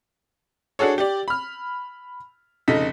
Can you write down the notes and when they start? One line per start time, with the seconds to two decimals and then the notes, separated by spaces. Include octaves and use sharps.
0.79 D4 F#4 G#4 A4 C#5
0.98 G4 D5
1.28 B5 F6
2.68 F1 C#3 D#4 A4 B6